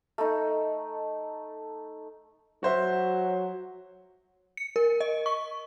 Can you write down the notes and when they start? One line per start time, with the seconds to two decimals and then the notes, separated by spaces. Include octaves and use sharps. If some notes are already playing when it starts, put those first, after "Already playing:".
0.18 A3 D#4
2.63 F#3 F#4 C5 E5
4.57 C#7
4.76 A#4
5.00 D#5
5.26 C#6